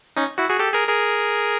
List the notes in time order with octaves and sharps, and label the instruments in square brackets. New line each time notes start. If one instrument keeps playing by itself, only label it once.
[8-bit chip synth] C#4 D#4
E4 F#4
F#4 G#4
G4 A4
G#4 A#4
G#4 A#4